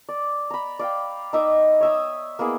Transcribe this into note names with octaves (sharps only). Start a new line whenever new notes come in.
D5
A#5 B5
D5 F5 G5
D#4 E5 D6 D#6
C#5 E5 D#6
A#3 B3 E4 G#4